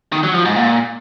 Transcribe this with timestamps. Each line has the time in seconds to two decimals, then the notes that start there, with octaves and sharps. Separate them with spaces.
0.12 D#3
0.23 F#3
0.34 F3
0.45 G#2
0.56 A#2